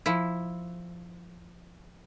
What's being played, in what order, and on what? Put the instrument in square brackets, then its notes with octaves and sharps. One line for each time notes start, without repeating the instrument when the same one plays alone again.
[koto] F3 E4